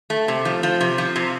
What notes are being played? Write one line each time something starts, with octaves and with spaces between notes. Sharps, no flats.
A3
C3
F3
F3
C3
F3
C3